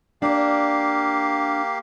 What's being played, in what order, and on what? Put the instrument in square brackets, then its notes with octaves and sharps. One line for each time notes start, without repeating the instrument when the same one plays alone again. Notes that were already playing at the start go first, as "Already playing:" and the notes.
[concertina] A#3 G4 F5 [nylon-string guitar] D4 D5